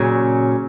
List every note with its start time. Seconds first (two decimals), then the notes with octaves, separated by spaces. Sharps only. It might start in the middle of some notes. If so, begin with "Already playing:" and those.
Already playing: A#2 C#3 F#3 C#4